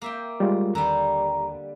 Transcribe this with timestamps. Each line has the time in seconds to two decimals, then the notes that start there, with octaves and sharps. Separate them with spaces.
0.02 A#3 E5 G5
0.40 G3 G#3 F4
0.75 D#2 D3 G3 A#5